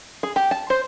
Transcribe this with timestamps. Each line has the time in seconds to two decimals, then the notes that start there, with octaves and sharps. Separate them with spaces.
0.23 G#4
0.36 G4
0.51 A5
0.70 C5